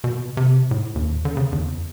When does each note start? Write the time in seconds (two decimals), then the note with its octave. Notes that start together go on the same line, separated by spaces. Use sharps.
0.04 B2
0.37 C3
0.71 A2
0.95 D#2
1.25 D3
1.37 C#3
1.52 E2